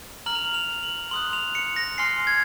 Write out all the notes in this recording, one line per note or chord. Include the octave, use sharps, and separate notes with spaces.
A#5 F6 F#7
F7
F#7
F7
F#7
C6 D#6 F#6 F#7
F7
C#7
A#6
G#5 C6 F6 C7
G#6